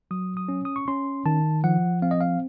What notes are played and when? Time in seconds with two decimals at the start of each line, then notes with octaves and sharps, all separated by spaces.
0.11 F#3 D#6
0.37 D#6
0.49 C#4
0.65 D#6
0.76 C#6
0.88 C#4 C6
1.26 D#3 A5
1.64 F3 F#5
2.02 C4 F5
2.11 D#5
2.21 F5